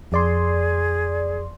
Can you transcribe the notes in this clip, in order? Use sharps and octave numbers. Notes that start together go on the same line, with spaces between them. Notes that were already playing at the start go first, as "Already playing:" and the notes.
F2 G#4 D5 C6